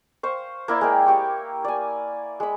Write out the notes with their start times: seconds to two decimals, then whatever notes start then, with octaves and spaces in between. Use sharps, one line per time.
0.23 C5 F5 C#6
0.68 A#3 E4 D5
0.81 G#3 A#4 G5
1.06 G4 C#6 D6
1.64 D5 G#5
2.40 G#3 B5